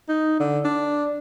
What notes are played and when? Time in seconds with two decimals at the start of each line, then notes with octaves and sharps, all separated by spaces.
0.09 D#4
0.40 D3
0.65 D4